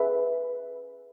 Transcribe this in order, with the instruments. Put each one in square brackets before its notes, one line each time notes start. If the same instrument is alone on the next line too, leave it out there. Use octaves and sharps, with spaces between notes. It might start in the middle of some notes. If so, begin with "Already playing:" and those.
Already playing: [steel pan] G#4 B4 E5